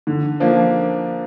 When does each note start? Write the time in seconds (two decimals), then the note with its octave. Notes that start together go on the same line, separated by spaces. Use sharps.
0.07 D3
0.40 F3 A#3 D4